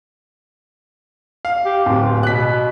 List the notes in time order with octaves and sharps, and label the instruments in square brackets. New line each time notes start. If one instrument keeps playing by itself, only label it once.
[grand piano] F5
[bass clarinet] G4
[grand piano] D1 [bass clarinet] C4
[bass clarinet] D#2
[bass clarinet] B2 [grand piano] F#6 B6